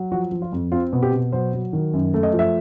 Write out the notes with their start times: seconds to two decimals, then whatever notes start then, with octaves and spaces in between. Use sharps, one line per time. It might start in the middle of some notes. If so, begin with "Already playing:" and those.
Already playing: F#3
0.12 F3 F#4
0.32 F3
0.42 F4
0.53 F2
0.72 C4 F4
0.93 B2
1.03 G4
1.13 B2
1.32 F#3 C5
1.53 F#3
1.73 D#3
1.93 F#2
2.14 A3
2.23 D#5
2.33 F3
2.39 E5